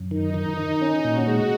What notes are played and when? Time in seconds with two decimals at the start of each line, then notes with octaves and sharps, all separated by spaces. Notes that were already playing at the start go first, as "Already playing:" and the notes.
Already playing: F#2
0.11 D#3 D#4
0.34 D#3
0.58 D#3
0.81 C#4
1.05 A#2 F#4
1.28 G#3